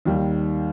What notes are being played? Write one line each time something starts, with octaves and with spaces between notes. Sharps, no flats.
D#2 D#3 G3